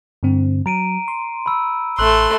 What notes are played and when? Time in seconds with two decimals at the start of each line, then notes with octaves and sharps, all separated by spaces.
0.23 G2 D3 C4
0.66 F#3 A#5 D7 D#7
1.08 C6
1.46 B5 E6
1.99 A1 A3 C6 E6 F#6 F#7